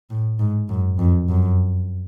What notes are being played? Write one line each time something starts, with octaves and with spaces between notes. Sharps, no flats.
A2
G#2
F#2
F2
F#2